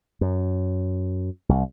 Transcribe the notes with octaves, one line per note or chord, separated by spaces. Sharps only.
F#2
C2